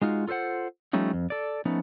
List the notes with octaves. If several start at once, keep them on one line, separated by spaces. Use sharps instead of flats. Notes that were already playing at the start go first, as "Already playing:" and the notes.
G#3 D#4 F4 F#4
F4 A4 B4 C5 F#5
F3 G3 A3 C#4 D#4
F2
A4 D5
F3 A3 B3 C#4 D#4